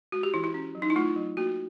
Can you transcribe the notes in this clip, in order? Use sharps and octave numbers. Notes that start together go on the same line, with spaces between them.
G#3 F#4
G4
E3 E4
E4
C#4
F#3
D#4
E4
A3 F4
F#3
A#3 F#4